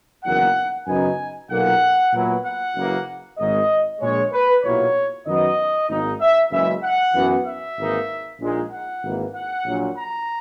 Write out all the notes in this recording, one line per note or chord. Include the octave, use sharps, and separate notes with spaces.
F#1 E2 D#3 F#3 A#3 F#5
F#2 C#3 F#3 B3 D#4 G#5
B1 A#2 A#3 F#5
A#2 F#3 B3 E4
F#5
F#1 F#2 C#3 E3 A#3
G#1 G#2 D#3 D#5
A#1 A#2 G#3 C#5
B4
B1 A#2 F#3 A#3 E4 C#5
F#2 D#3 F#3 B3 D#4 D#5
G#1 G#2 D#3 A#3 D#4
E5
F#1 F#2 C#3 E3 G#3 E5
F#5
F#2 E3 B3
E5
G#1 G#2 E3 A#3 D#4
A#1 A#2 G#3 D#4
F#5
G#1 G#2 E3 A#3
F#5
A#1 A#2 F#3
A#5